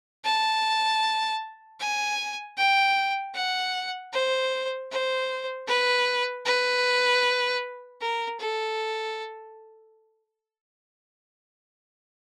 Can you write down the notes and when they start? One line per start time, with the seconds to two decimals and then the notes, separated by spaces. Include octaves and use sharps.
0.24 A5
1.80 G#5
2.57 G5
3.35 F#5
4.13 C5
4.91 C5
5.68 B4
6.45 B4
8.01 A#4
8.40 A4